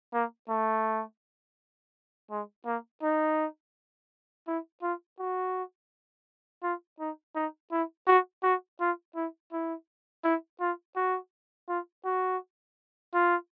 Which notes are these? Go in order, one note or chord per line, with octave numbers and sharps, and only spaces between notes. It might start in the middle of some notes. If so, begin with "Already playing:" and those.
A#3
A3
G#3
A#3
D#4
E4
F4
F#4
F4
D#4
D#4
E4
F#4
F#4
F4
E4
E4
E4
F4
F#4
F4
F#4
F4